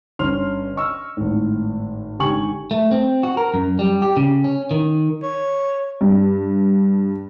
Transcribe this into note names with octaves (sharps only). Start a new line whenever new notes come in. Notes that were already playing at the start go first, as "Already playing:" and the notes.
G1 C#4 C6 F6 F7
D#5 C#6 E6 F6
G#1 A2
G#1 D3 G4 G#5 C#6 F#7
A3
C4
F#4
A#4
F#2
G3
G4
C#3
C#4
D#3
C#5
G2